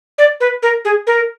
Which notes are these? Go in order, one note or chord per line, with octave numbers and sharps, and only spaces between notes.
D5
B4
A#4
G#4
A#4